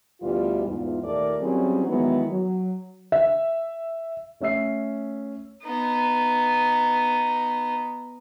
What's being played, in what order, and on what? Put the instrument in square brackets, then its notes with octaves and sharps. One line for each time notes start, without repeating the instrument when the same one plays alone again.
[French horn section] D2 B2 E3 G3 F4
E2 G#2 F4
D#2 A#2 A3 A#4 D5
F#3 G3 C4 C#4 E4 G#4
D#3 E3 F#3 G#3 B3 E4
F#3
[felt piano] E5
[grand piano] A3 C#4 E5 E6 C7
[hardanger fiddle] B3 D#4